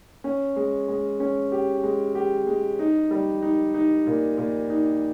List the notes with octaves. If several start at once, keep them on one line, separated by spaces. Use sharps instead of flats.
C#4
G#3
G#3
C#4
G4
G#3
G4
G#3
D#4
G3
D#4
D#4
A#2
A#2
D#4